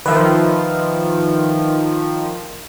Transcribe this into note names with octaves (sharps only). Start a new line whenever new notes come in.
D#3 F3 B4 E5